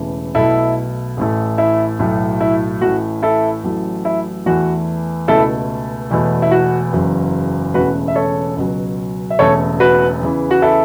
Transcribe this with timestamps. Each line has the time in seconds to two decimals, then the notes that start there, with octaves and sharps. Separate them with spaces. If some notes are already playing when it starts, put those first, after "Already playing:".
Already playing: E1 E2 C#3 E3 A3
0.35 B1 B2 A3 E4 A4
1.17 A1 A2 A3
1.58 E4
1.99 B1 A2 F#3 A3
2.40 E4
2.81 A1 A2 A3 F#4
3.22 E4 A4
3.64 A1 A2 F#3 A3
4.05 E4
4.46 E2 E3 A3 F#4
5.28 C#2 B2 A3 E4 A4
6.11 E1 E2 B2 A3
6.42 E4
6.51 F#4
6.93 F#1 E2 C#3 F#3
7.74 E1 E2 C#3 A3 F#4 B4
8.08 E5
8.15 A4 C#5
8.57 C#2 B2 F#3
9.30 E5
9.39 E1 E2 C#3 A3 A4 C#5
9.80 F#4 B4
10.21 E2 C#3 E3
10.51 F#4
10.62 E4 A4